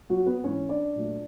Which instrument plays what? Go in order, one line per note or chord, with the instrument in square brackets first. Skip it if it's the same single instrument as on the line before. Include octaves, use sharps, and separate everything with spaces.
[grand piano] F#3 F#4
B3 B4
G#2 E3 G#3 C#4 C#5
D4 D5
A#2 F#3 A3